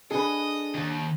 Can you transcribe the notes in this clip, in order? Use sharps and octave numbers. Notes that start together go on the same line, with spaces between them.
D4 G#4 A4 B4 D#5
D#2